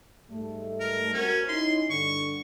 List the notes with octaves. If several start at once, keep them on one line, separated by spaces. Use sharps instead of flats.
G#2 G3 A3
A#4
C4 C#4 F#4 A#4
C#4 D#4 E4 C6
G2 D3 C#6